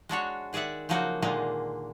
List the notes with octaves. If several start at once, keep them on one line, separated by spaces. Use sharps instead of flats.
G#3 D4 F#4 C#5
D#3 G#4 D5 E5 F#5
C#3 F3 F#3 A#3 D#4 F#4
A#2 D3 D#3 G#3 A#3